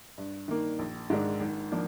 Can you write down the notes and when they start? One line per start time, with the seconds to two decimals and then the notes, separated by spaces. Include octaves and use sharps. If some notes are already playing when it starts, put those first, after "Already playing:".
0.18 G2
0.48 D#3 A#3
0.79 A#1
1.10 G#2 D#3 G#3 D4
1.40 G#1
1.72 F3 A#3 D4